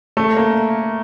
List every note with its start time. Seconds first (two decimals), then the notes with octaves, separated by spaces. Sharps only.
0.17 A3
0.37 A#3